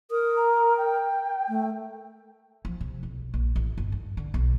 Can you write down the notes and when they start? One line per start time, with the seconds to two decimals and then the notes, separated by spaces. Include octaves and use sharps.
0.11 A#4 D#6
0.35 A#5
0.77 G5
1.49 A3
2.65 F3
2.81 C3
3.03 B1
3.34 A#1
3.56 A1
3.78 G1
3.92 G2
4.17 D3
4.34 B1